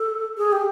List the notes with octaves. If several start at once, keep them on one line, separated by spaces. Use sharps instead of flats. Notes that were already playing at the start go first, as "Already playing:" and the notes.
Already playing: A4
G#4
G4